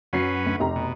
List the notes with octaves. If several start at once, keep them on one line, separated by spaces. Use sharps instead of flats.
F#2 F#3 C#4 B4 C7
D2
F1 G4 A#5
B2